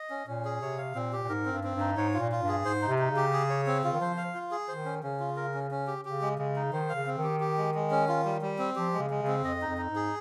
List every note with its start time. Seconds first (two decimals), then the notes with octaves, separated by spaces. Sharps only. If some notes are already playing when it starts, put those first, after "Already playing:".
Already playing: D#5
0.10 C#4
0.27 A#2 C#4
0.45 G#4
0.61 C3 C#5
0.78 F5
0.95 A#2 C4
1.13 G4
1.23 A#2
1.29 G#2 A#4
1.46 C4
1.52 G2
1.64 C4
1.75 G2
1.80 D#4
1.97 G#2 C#5
2.14 F4
2.20 A#2
2.32 F4
2.42 G2
2.48 G#4
2.65 G#2 C5
2.82 D#4
2.88 C3
2.98 D#4
3.11 C#3
3.16 G4
3.33 G#4
3.50 C#5
3.67 C4
3.84 C#3 F4
3.93 D#3
4.01 F3 C5
4.17 F5
4.34 F4
4.51 G#4
4.68 D#3 C5
4.85 C#4
5.03 C#3 C#4
5.20 F4
5.36 A#4
5.54 C#4
5.71 C#4
5.87 G4
6.05 C#3 G4
6.21 G#3
6.38 C#3 G#3
6.56 D#4
6.73 D#3 C5
6.89 F5
6.95 C#3
7.07 C4
7.18 D#3
7.24 G4
7.40 G4
7.58 G#3
7.74 G#3
7.91 C#4
8.09 F4
8.25 G3
8.42 G3
8.59 C4
8.76 F3 G4
8.93 G#3
8.99 C#3
9.10 G#3
9.22 C#3
9.27 C4
9.44 F2 D#5
9.62 D#4
9.67 F2
9.78 D#4
9.90 G#2
9.95 G#4